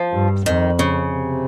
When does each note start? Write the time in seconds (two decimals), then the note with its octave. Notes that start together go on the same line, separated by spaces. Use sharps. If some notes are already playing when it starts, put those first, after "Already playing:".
Already playing: F3
0.13 G2
0.46 F2 D#3
0.79 C#3
1.12 C3